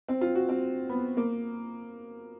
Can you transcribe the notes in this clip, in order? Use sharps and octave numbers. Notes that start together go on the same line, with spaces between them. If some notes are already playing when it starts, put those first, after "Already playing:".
C4
F4
F#4
C4
B3
A#3